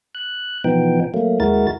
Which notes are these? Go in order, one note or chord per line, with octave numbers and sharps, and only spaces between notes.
F#6
B2 E3 F3 B3 D#4 G5
F#3 A3 A#3
D#2 G#3 E4 F#4 A#4 A6